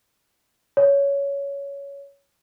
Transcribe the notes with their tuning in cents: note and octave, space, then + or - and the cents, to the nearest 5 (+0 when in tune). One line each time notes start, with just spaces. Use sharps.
C#5 +15